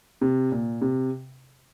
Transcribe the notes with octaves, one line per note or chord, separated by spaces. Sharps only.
C3
A#2
C3